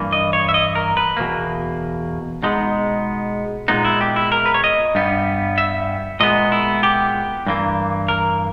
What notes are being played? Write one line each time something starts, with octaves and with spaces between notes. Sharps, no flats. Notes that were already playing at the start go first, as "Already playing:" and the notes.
Already playing: G2 E3 A#3
D#5
C#5
E5
D#5
A#4
B4
E2 B2 A#3
B2 G#3 B3 D#4
A#2 G#3 B3 D#4
E4
G4
E4
A#4
B4
C#5
D#5
G2 G3 B3
E5
A#2 G#3 B3 D#5
E4
G4
G2 E3 A#3
A#4